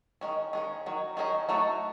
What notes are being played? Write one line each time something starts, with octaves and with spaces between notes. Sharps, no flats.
D#3 G#3 C#4
D#3 G#3 C#4
D#3 F#3
D#3 F#3 C#4 G#4 D#5
F#3 A3 D#4 A4